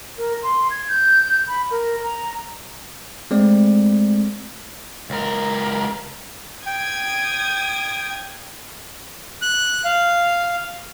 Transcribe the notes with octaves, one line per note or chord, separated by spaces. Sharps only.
A#4
C6
G#6
G6
B5
A#4
A#5
G#3 A3 C4 D5
C#2 A#4
G5 D#6 G#6
F#6
F5